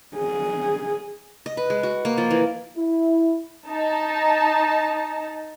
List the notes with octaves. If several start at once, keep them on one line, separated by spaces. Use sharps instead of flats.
G#4
D#5
B4
G#3
F#4
A#3
F3
E3
E4
D#4 A5